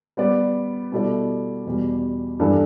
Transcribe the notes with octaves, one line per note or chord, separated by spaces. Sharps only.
G3 B3 G4 D5
B2 G3 E4 A4 D5
E2 B2 G3
G2 E3 G3 D4 A4